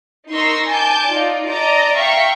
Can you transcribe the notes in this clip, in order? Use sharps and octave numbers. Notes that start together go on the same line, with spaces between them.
D#4 A#4 C6 C#6 E6 A#6
G#5 A5 D6 G6
D#4 F4 D5
D5 D#5 A5 A#5 D6
E5 F5 G5 A#5 C#6